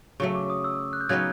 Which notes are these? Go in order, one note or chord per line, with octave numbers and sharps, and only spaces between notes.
C#3 F#3 A3 C#6
D6
D#6
E6
F#6
G6
C#3 F#3 B3 D#4 F#6 G#6